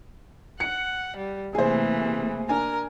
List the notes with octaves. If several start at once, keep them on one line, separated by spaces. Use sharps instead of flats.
F#5 C#7
G3
C3 E3 A3 A#3 G#4 C5
D4 A#4 G#5